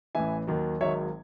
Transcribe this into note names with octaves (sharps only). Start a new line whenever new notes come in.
A1 A2 E3 E5 G#5
D#2 D#3 F#3
G#1 G#2 D#3 F#3 C#5 E5